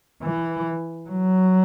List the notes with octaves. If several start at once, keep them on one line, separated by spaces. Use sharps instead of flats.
E3
F#3